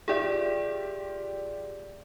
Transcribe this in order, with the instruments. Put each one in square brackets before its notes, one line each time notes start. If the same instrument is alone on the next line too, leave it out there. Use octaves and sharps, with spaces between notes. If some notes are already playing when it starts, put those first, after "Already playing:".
[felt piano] F4 G4 E5 [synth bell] G#4 D5